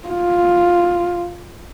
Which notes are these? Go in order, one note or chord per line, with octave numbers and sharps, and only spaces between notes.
F4